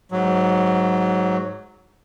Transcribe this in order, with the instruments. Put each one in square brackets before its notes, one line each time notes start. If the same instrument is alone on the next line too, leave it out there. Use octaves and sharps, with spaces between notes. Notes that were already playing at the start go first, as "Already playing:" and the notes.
[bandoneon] G#2 F#3